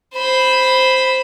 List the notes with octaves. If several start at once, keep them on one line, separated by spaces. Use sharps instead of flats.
C5 B5